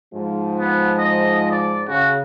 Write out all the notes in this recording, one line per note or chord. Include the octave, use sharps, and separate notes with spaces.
G#2 F3 G#3
B3
D#5
D5
C#3 F#4